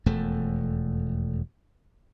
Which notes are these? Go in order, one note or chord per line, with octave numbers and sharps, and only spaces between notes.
E1 F2 A3